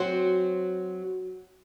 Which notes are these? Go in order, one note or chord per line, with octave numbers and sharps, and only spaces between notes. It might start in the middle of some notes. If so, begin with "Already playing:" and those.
Already playing: F#3 C4 F#4 C5